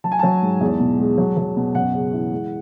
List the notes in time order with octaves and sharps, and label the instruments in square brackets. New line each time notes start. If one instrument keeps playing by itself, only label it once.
[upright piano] F#3 A5
G#5
F#3 A5
G#2
E2
B2
G#3
F#3
F#3
B2
F#2 F#5
C#3
E3
G#3